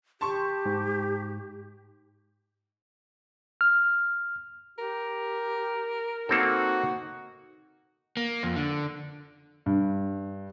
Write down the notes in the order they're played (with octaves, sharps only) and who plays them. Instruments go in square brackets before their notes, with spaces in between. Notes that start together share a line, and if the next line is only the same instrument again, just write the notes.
[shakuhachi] G4 [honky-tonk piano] A5 C6 C#6
[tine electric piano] G#2
F6
[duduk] G4 [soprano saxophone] A#4
[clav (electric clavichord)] A#3 C4 A4 [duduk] D#4 [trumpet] F#4
[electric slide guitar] A#3
F2
D3
[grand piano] G2